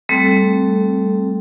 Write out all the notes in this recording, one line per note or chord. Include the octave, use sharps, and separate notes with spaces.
G3 A3 C4 A4